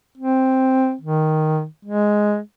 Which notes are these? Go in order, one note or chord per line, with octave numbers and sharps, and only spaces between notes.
C4
D#3
G#3